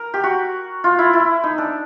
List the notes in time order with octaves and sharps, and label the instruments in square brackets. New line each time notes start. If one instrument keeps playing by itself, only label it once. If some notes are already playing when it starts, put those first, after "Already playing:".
Already playing: [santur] A#4
G4
F#4
F4
E4
E4
D#4
D4